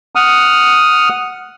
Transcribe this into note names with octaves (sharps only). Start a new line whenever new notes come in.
F#5 D#6 F6